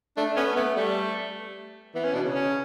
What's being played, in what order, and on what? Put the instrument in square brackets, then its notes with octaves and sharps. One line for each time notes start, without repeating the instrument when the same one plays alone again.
[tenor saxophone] A3 [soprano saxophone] D4
[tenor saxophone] B3 [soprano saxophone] C#4
[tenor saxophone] A3 [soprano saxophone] B3
[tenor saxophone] G3 [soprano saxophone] A3
[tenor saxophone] E3 [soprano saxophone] B3
[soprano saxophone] C#4
[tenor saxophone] B2 [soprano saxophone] D4
[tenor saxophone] C#3
[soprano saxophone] C#4